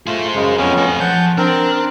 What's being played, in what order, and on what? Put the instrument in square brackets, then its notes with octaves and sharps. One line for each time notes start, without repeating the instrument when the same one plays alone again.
[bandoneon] A3 F4 [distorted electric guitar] G#4 C5
[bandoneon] F#2 C#3 G#3
[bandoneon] F2 B3 C#4 [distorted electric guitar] B4 F5
[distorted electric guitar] A3 G#5
[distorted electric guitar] F3 [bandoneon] F#5 A5 G6
[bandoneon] C4 A#4 [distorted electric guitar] D4